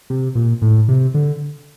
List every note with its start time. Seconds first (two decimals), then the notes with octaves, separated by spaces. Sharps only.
0.10 C3
0.35 A#2
0.62 A2
0.88 C3
1.14 D3